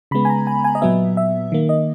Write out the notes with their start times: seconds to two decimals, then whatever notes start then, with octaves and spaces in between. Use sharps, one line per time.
0.11 C#3 G#3 B3 B5
0.25 G#5
0.30 A#5
0.47 G#5
0.64 G#5
0.75 D#5
0.82 A#2 F#3 B3 E5
1.17 E5
1.52 D#3 A#3
1.69 D#5